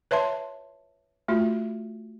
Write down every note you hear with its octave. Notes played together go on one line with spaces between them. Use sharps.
B4 C#5 E5 A5 C6
A3 F4 F#4